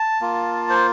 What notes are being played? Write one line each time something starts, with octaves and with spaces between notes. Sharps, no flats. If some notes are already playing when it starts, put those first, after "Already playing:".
Already playing: A5
A#3 F4
C5